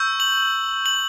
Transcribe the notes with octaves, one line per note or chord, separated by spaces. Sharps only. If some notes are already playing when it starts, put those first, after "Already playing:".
Already playing: C#6 E6 G6
F#7
F#7